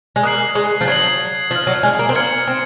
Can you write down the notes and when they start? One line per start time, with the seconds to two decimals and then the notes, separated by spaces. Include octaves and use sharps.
0.16 G#3
0.23 A#3 D#6 F#6 C7 F#7
0.55 G#3
0.81 F3
0.88 F#3 G#6 C7 F#7
1.51 F3 F6 C7 F#7
1.67 F#3
1.83 G#3
1.99 A#3
2.09 C4
2.15 A#3 F6 G#6 C#7 F#7
2.47 C4